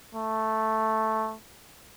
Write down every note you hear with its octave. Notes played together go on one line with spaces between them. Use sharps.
A3